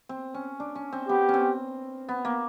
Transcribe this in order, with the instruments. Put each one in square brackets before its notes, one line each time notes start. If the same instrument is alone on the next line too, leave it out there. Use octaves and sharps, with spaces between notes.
[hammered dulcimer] C4
C#4
D4
C#4
C4
[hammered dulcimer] B3 [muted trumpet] G4
[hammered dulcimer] C4 C#4
B3
A#3